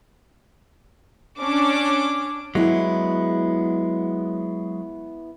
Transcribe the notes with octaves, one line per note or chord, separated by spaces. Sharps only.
C#4 D4 D6
F#3 G#3 B3 E4